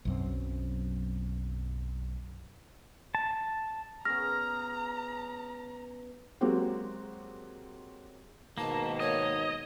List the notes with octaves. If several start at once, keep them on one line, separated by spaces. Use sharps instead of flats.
B1 F#2 C4
A5
B3 C#4 G#4 A#5 F6 A#6
F#3 G#3 A#3 C4 F#4 G4
G#2 B2 D#3 A#3 A5
C#5 D#5